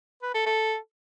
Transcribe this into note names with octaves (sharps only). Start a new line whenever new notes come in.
B4
A4
A4